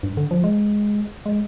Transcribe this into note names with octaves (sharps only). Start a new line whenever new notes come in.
G2
D3
F3
G#3
G#3